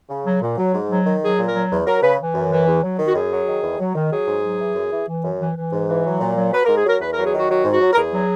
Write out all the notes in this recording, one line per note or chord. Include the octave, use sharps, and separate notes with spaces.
C#3
F#3
A#2
F#3
G#2
F#3
D#3
F#3 G#4
A#2
A#4
F#3
E2
F#3 A#4
C#3 B4
E3
F#2
E3
E2
F#3
D#3
F#4
F#2 G#4
F#3
D#3
E2
F#3
D#3
F#3 G#4
G#2
F#3
E3
F#2
E3
E3
F#2
E3
E3
G#2
E3
F#3
A#2
F#3
F#3 B4
A#4
G#2
G#4
F#3 A#4
E2 B4
A#4
F#3
G#4
D#3 F#4
F#3 F#4
G#2
F#4
F#3
A#4
E2 G#4
F#3